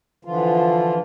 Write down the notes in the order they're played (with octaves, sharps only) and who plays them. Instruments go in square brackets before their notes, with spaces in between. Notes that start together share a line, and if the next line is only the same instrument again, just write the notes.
[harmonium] D3 E3 F3 F4